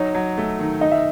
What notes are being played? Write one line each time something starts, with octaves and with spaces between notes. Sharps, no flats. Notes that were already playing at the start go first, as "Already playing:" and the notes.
Already playing: F#3 D#4 C#5
F#3
A3
D#3
D#4 D#5
E5